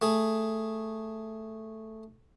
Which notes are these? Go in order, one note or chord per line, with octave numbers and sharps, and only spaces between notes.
A3 G#4